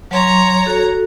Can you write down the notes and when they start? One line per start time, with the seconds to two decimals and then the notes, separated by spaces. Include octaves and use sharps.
0.11 F#3 C#5 A#5 C6 C#6
0.66 F#4 A4